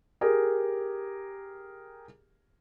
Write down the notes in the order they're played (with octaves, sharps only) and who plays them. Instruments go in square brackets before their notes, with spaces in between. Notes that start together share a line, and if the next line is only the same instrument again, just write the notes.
[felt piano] G4 G#4 A#4